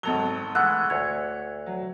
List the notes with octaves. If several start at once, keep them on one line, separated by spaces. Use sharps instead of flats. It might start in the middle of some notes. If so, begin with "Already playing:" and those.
G#1 F#3 A4 A#5 G7
E3 G#3 A3 F#5 E6 F#6
D2 C#5 G#6
F#3